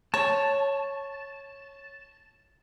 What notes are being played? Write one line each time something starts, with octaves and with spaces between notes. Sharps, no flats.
C#5 A5